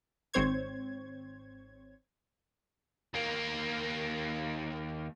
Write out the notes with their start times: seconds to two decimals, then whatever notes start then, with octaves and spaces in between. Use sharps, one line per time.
0.34 G#1 G#2 C4 C5 C#5 G#6
3.14 D#2 A#3